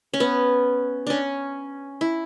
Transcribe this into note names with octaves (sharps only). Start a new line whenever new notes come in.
C#4
B3
C#4 D4
E4